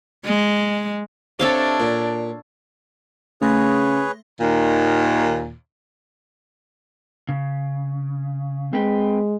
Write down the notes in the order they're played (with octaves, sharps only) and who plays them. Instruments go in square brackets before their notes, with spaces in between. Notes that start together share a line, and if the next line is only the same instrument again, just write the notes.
[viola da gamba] G#3
[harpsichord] C3 [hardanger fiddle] D4 [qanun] A4 C#5 F5
[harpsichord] A#2
[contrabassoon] C#3 [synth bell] A3 C6 A#6 [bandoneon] G#4 B4 C#5
[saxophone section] D#2 A#2 D#3
[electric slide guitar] C#3
[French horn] G#3 [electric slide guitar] C4 B4 G5